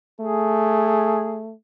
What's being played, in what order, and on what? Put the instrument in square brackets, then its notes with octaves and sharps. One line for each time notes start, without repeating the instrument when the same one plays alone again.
[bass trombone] A3 [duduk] G#4